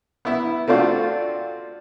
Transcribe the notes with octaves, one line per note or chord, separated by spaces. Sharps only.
B3 E4 E5
A3 C4 D4 F4 F#4